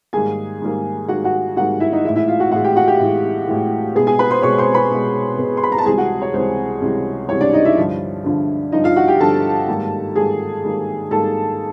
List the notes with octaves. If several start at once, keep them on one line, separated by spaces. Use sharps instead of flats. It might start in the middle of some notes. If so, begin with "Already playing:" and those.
G#2 D#3 G3 A#3 G#4 G#5
G#2 D#3 G3 A#3
G#2 D#3 G3 A#3 F#4 F#5
F#4 F#5
G#2 D#3 G3 A#3 F#4 F#5
E4 E5
D#4 D#5
A2 E3 G#3 E4 E5
E4 E5
F4 F5
F#4 F#5
A2 E3 G#3 F#4 F#5
G4 G5
F#4 F#5
G4 G5
A2 E3 G#3
A2 E3 G#3
B2 G#3 B3 G#4 G#5
G#4 G#5
B4 B5
C5 C6
B2 G#3 B3 C#5 C#6
C5 C6
B4 B5
B2 G#3 B3
B2 G#3 B3
C6
B5
A#5
A5
C#2 C3 E3 G3 G#4 G#5
F#4 F#5
C#5
C#2 C3 E3 G3 C5
C#2 C3 E3 G3
C#2 C3 E3 G3 C#5
D4 D5
D#4 D#5
E4 E5
G2 D3 F3
G2 D3 F3
G2 D3 F3 D#4 D#5
F4 F5
F#4 F#5
G4 G5
G2 D3 F3 A4 A5
G#2 D#3 G3 A#3
G#2 D#3 G3 A#3 G#4 G#5
G#2 D#3 G3 A#3
G#2 D#3 G3 A#3 A4 A5